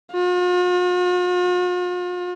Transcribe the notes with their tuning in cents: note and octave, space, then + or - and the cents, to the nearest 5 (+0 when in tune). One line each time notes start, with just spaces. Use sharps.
F4 +45